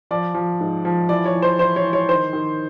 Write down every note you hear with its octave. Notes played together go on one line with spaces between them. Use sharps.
F3 D5
F3
G#2
F3
E3 D5
C#5
E3
C5
E3 C5
C#5
E3
C#5
D#3 C5
D#3